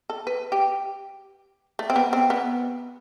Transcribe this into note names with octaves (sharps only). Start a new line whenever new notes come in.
A4
B4
G4
A3
C4
B3
C4
B3